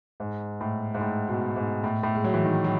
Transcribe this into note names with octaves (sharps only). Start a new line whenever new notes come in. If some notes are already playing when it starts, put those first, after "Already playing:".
G#2
A2
G#2
A2
B2
G#2
A2
A2
G#3
F#3
E3
D#3
F#3